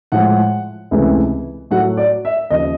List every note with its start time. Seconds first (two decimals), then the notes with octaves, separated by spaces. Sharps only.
0.12 A2 F3 G#3 F#5
0.91 C#2 C3 E3 A3
1.71 A2 F#3 A3 F#5
1.97 D5
2.25 E5
2.50 D#2 C#3 F3 D#5